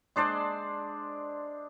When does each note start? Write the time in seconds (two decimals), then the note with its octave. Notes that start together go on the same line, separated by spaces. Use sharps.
0.16 G#3 D4 C5 D5